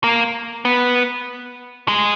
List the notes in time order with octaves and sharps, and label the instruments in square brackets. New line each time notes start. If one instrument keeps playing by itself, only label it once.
[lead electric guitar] A#3
B3
G#3